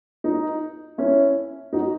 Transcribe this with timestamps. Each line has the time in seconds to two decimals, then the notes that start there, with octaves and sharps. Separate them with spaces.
0.24 D#4
0.98 C#4 E4
1.73 D#4 F#4